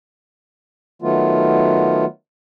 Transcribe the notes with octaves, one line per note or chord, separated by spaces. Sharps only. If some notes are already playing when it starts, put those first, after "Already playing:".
D#3 F#3 A3 B3 F4